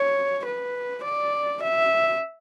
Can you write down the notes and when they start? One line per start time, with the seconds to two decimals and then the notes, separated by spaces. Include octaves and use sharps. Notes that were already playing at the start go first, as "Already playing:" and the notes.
Already playing: C#5
0.45 B4
1.04 D5
1.63 E5